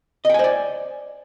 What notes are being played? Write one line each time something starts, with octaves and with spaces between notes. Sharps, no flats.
C5 D5 D#5 G5 G#5